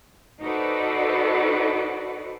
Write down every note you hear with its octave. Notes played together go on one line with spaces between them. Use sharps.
D#4 F#4 A4 B4 C5 D5